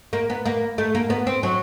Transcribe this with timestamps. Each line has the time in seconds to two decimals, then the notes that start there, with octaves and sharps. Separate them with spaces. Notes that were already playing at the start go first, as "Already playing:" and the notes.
0.13 A#3
0.30 B3
0.46 A#3
0.78 A3
0.95 A#3
1.10 B3
1.27 C4
1.43 F#3